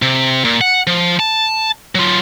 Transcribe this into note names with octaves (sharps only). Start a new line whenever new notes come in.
C3
A#2
F#5
F3
A5
F#3 F4